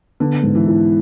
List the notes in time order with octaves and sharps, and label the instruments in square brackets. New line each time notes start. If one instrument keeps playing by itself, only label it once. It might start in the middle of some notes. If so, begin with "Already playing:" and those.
[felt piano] D3 [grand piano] B3
[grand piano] G#2
[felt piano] E3
[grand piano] E4